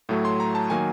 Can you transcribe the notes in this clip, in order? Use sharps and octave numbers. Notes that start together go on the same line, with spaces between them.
A2 F#3 A3
C6
A#5
A5
D#3 F#3 A#3 G#5